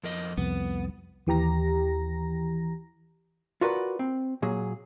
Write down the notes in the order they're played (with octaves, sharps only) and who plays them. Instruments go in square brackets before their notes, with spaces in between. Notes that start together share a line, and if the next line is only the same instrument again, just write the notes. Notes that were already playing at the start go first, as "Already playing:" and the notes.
[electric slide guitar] F2 A#4 D#5
[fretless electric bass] C2 F2 [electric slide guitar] B3
[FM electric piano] D#2 E3 G4 A#5 A#6
[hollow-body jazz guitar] F4 F#4 A#4 B4 D5 F#5
C4
A#2 F#3 G#4